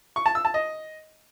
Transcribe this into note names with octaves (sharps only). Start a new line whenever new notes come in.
C#6
A5
E6
A5
D#5